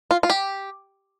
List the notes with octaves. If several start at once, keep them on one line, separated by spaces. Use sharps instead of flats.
F4
F4
G4